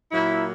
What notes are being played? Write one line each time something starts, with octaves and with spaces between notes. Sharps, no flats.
A#2 F#3 A#3 E4